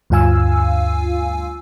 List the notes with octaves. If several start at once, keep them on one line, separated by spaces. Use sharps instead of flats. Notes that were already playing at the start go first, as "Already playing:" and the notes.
D2 G2 F4 F5 G#5 E6